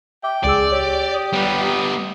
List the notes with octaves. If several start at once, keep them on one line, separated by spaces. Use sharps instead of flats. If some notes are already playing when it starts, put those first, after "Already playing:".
E5 G5 D6
C#2 G#4 D5 E6
G4 C#5
D#6
G3 B3